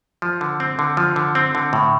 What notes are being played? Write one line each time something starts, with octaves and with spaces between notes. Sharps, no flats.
F3
D3
C4
D3
F3
D3
C4
D3
A2